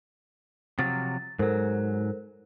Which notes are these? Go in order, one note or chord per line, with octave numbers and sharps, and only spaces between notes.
C3 F3 F#3 A6
G#2 F#3 A4 A#4 C5